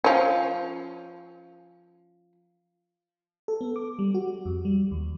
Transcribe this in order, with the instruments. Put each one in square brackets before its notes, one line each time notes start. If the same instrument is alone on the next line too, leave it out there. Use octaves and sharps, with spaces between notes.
[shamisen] F3 C#4
[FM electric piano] A4
B3
D6
G3
F#4
F2
G3
D#2